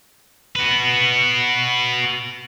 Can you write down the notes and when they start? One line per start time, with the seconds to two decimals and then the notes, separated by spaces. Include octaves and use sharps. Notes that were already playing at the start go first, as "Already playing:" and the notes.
0.56 F#4 B4